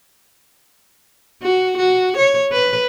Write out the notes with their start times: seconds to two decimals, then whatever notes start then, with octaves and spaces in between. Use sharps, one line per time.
1.42 F#4
1.78 F#4
2.17 C#5
2.52 B4